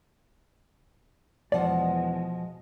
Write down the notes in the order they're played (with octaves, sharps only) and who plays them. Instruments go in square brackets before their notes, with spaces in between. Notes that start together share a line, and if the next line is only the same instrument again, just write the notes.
[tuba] E2 [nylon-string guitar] B2 F3 F#5 [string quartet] G#3 [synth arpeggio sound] D5